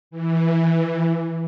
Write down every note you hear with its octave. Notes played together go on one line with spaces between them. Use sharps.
E3